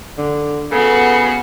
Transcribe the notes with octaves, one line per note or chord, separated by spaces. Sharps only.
D3
C#3 B3 F#4 A4